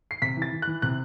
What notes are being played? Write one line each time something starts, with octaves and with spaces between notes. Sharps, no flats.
C7
C3 B6
E3
A6
E3
E3 F#6
C3 F#6